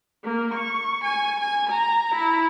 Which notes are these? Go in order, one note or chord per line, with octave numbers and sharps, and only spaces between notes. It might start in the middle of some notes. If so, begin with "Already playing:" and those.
A#3
C#6
G#5
G#5
A#5
E4